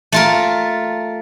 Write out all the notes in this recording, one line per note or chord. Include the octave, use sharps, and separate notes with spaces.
A3 F4 A#4